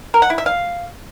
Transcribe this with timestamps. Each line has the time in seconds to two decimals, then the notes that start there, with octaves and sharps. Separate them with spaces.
0.14 A#4
0.22 F#5
0.30 E4
0.38 E5
0.46 F5